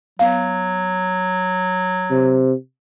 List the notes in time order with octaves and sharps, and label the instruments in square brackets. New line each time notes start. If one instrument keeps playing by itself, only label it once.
[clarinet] F#3 [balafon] B3 F5
[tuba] C3